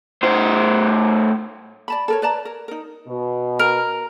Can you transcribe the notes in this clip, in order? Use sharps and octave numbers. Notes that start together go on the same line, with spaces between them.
A2 C5
D5 A5 B5
A4 A#4 C#5
B4 D5 A5 A#5
A#4
D#4 A#4
B2
A#4